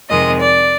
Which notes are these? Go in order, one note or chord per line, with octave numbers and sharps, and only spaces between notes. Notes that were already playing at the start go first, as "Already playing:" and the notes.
F2 C3 D#3 G#3 D#5
D5